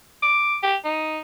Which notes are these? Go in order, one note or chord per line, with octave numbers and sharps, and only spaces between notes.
D6
G4
D#4